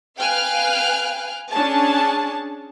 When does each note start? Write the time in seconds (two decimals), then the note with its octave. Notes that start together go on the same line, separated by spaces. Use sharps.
0.18 B4 F5 G5 G#5 F6 F#6
1.51 C#4 D4 G#4 A5